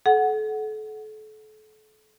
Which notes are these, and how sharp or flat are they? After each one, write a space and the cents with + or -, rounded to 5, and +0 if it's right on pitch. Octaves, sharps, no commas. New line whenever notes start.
A4 -35 F#5 +0